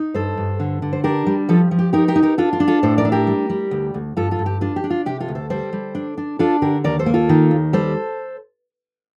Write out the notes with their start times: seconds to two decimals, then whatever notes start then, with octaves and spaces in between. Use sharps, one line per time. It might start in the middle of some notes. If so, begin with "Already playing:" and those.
Already playing: D#4
0.14 G2 A4 C5
0.37 G2
0.60 D3
0.82 D3
0.93 C5
1.04 D4 G4 A#4
1.26 G3
1.49 F3 F4 A4
1.71 F3
1.79 G4
1.93 D#4 G4 A#4
2.08 G4 A#4
2.16 D#4
2.23 G4 A#4
2.38 D4 F4 A4
2.53 F4
2.60 D4
2.68 F4 A4
2.83 A2 A4 C5
2.98 A#4 D5
3.05 D4
3.12 G4 A#4
3.27 G3
3.50 G3
3.71 D2
3.94 D2
4.17 G2 F4 A4
4.31 F4 A4
4.39 G2
4.46 G4
4.61 D4 F4
4.76 G4
4.84 D4
4.90 F4
5.06 C3 G4
5.20 F4 A4
5.28 D2
5.35 A4 C5
5.50 G3 A4 C5
5.73 G3
5.95 D4
6.18 D4
6.39 D4 F4 A4
6.62 D3 G4 A#4
6.84 D#2 A#4 D5
6.99 A4 C5
7.06 A#3
7.14 F4 A4
7.29 D#3
7.51 D#2
7.73 G3 A4 C5